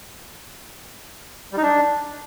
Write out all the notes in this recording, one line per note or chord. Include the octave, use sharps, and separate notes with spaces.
G3
D#4
D4